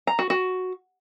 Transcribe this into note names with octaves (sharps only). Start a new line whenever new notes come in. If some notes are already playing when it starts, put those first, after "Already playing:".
A#5
F#4
F#4